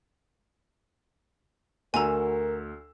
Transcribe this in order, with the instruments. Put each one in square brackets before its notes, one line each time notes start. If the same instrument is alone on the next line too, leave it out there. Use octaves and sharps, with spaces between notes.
[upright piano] D2 F#4 E6 [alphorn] A#4 [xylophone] G#5 A#5